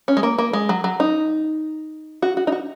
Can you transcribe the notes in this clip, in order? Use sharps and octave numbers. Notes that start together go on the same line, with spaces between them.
C#4
G#3
A#3
A#3
G#3
F#3
F#3
D#4
F#4
F#4
D#4
F#4